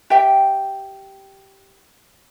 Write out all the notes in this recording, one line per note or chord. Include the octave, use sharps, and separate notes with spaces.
G4 E5 G5